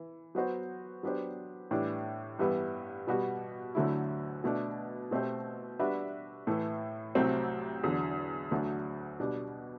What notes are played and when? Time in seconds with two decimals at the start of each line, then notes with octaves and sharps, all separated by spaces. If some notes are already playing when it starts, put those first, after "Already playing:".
Already playing: E3
0.35 F#3 B3 F#4 C5
1.03 F#3 B3 D4 G4 C5
1.71 A2 E3 G3 D4
2.39 G2 E3 G3 B3
3.07 B2 G3 B3 F#4
3.75 D2 D3 F#3 A3 E4
4.44 B2 A3 D4
5.11 B2 A3 C4 G4 C5
5.79 G3 D4 F#4 B4 E5
6.47 A2 E3 A3
7.15 C2 C3 F#3 A3 C4
7.83 E2 D3 F#3
8.51 D2 D3 F#3 A3
9.20 B2 G3 D4